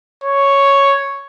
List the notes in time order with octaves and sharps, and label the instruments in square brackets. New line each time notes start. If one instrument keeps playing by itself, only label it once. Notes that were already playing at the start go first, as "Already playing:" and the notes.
[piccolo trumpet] C#5